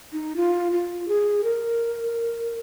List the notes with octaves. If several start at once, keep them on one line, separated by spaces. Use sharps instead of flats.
D#4
F4
F4
G#4
A#4